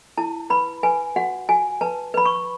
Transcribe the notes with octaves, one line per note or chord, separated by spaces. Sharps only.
E4 A5
B4 B5
B4 G#5
F#4 F#5
F#4 G#5
B4 A5
B4 B5
C#6